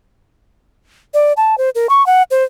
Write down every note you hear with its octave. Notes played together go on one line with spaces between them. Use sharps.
D5
A5
C5
A#4
C#6
F#5
C5